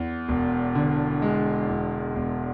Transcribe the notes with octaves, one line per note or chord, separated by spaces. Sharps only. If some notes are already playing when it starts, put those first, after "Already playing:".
Already playing: E2
E1
D3
G#3
E2
E1